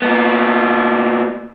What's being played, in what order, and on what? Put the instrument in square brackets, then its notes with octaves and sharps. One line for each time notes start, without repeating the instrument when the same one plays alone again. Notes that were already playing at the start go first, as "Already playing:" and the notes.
[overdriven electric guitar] A#2 B3